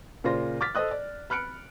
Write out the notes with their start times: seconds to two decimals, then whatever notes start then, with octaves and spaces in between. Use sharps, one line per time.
0.24 A#2 C#3 F4 C5 C6 A#6
0.61 D6 F6 A6 B6
0.75 A4 C5 D#5 D#6 F#6
0.91 D5
1.30 B5 F6 F#6 C#7 D7